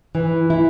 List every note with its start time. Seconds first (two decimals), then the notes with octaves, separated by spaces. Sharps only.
0.15 E3
0.50 E4